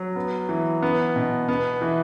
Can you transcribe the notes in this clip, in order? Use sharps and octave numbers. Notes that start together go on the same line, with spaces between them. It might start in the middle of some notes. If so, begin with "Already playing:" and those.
Already playing: F#3
B3
E3
B3
B2
B3
E3